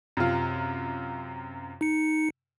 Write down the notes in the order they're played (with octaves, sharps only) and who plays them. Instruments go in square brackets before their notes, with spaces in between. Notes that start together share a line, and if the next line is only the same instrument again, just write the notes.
[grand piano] F#2 C3 F4
[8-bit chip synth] D#4 C#7